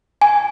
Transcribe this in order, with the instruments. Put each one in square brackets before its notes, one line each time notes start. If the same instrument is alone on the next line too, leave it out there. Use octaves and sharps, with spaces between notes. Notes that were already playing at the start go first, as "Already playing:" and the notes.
[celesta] G#5